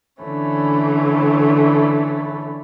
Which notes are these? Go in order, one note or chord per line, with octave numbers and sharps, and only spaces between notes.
D3 E3 A3 C#4